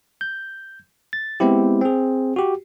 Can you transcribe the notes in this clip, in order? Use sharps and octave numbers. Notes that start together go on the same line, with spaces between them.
G6
A6
G#3 B3 C4 E4 G4
C4 G#4
F#4 G4